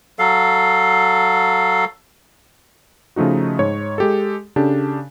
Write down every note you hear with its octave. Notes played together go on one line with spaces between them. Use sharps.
F#3 A4 F5
C#3 F3 A3 D#4 F#4
G#2 C#5
G#3 G4 A4
C#3 D4 G4 A4